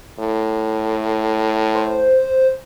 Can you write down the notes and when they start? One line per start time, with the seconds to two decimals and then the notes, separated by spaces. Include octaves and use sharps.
0.19 A2
1.75 C5